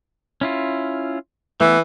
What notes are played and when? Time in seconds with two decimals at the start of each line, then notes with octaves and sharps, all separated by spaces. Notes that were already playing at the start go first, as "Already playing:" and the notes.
0.41 C#4 E4 F4
1.61 E3 A3 B3